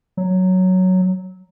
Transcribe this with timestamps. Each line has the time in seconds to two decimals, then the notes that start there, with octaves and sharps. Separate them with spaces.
0.17 F#3